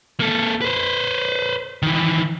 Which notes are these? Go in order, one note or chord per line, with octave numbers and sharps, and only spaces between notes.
A#3 A4
B4 C5
D#3 E3